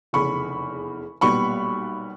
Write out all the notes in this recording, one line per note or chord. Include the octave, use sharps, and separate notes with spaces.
F1 E2 C#3 B5 C#6
B1 A#2 G3 B3 B5 C#6